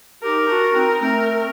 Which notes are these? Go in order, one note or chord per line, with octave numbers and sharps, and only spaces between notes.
D#4 G4 A#4
D4 F#4
C4 D#4
A3 C4 A#4